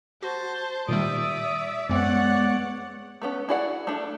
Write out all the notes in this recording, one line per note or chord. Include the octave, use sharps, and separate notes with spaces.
F#4 C5 A5
A#2 D#3 G3 D5 E5 D#6
F#2 G#3 B3 C4 C#5 D5 F#5
A3 B3 C#4
E4 F#4 G#4 D5 F#5
A3 D4